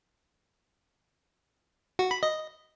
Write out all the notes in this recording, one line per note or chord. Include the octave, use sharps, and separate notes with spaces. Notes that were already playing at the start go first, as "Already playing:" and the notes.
F#4
B5
D#5